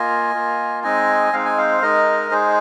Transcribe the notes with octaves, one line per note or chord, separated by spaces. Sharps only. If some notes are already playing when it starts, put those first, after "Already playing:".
Already playing: A#3 F4 D#5 G#5
A#3 F4
G#3 C4 D#4 D#5 G#5
G#3 C4 D#4 F5
G#5
C5 F5
G#3 D#4 A#4 D#5
G#3 D#4 G#4 C5